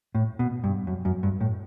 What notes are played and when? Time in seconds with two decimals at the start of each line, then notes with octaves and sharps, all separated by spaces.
0.15 A2
0.39 B2
0.64 G2
0.87 F#2
1.05 F#2
1.23 G2
1.41 A2